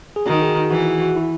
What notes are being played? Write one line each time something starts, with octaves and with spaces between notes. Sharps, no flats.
G#4
D#3 F#4
G#4
F#4
E3 F#4
E4
F#4
E4